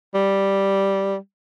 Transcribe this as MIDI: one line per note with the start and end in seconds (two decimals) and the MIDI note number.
0.15 1.16 55